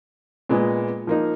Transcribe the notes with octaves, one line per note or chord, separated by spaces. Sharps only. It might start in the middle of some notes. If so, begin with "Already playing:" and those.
A#2 G#3 B3
F3 A#3 D#4